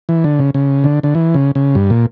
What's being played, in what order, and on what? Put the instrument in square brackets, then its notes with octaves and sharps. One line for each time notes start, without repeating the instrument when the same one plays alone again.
[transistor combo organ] E3
D3
C#3
C#3
D3
D3
E3
C#3
C#3
G2
A#2